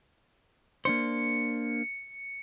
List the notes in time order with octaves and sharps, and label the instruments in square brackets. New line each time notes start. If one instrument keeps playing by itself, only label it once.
[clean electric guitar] A#3 D4 C5 [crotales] C#7